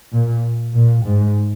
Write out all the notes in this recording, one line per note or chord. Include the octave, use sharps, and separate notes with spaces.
A#2
A#2
G#2